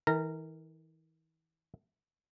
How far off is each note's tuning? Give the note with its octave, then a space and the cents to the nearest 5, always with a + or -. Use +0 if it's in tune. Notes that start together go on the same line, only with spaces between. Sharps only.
E3 -45 A#4 -20 A#5 -20